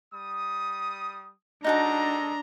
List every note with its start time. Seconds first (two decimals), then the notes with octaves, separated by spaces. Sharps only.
0.12 G3 D#6
1.64 G#3 D4 D#4 F#4 A4 D#5 A5 A#5